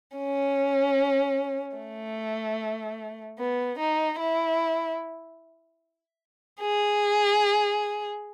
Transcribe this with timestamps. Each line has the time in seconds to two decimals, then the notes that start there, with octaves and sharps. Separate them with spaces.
0.17 C#4
1.78 A3
3.39 B3
3.79 D#4
4.19 E4
6.61 G#4